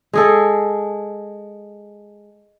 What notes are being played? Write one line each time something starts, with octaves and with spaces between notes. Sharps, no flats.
G#3 G#4 A4